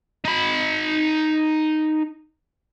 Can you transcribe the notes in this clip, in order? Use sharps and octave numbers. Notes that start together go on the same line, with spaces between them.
D#4 B5